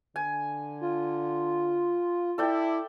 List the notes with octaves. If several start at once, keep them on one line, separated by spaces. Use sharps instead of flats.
D3 G#5
F4
E4 A4 D5 G5